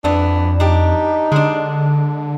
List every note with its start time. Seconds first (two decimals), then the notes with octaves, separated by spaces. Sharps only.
0.04 F2 E3 B3 D4
0.60 D4 D#4 G4
1.32 D3 G#3 D4